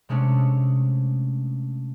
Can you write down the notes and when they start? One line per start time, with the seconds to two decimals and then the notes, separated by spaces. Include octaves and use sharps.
0.09 C3 G#3 A3 C#4 D4